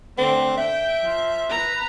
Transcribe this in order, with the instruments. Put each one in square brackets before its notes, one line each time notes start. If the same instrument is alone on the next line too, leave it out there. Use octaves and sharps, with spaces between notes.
[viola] D3 A3 [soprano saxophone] C4
[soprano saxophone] E5 [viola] G5
[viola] F3
B4 A#5